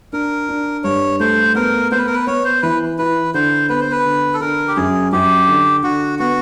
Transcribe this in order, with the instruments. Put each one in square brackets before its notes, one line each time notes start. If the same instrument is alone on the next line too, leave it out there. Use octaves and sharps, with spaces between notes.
[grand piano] D4 [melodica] A#4
[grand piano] D4
[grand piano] G2 [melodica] C#5
[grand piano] A3 [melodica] C5
[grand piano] B3 [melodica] A#4
[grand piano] B3 [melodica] C5
[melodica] B4
A#4
B4
[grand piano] B3 [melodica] C#5
[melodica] C5
[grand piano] E3 [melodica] B4
[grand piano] E4 [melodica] B4
[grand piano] D3 [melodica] C5
[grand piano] B3 [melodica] B4
[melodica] C5
B4
[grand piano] D3
[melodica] A4
[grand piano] D3 [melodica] A#4
[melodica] G4
[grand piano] F#2 [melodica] G#4
[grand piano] F#2 [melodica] G4
[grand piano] D3
[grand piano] D3 [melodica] F#4
[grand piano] B3 [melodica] F#4